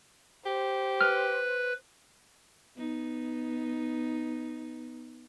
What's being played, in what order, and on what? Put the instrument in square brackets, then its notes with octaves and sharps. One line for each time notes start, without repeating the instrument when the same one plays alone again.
[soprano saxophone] G4 [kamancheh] C5
[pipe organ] B4 [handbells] F6
[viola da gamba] B3 D#4